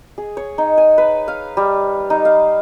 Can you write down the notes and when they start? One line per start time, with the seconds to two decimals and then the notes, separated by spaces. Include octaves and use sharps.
0.18 G#4
0.37 C#5
0.58 D#4
0.77 G#5
0.98 B4
1.28 F5
1.57 G3
2.10 D#4
2.25 F5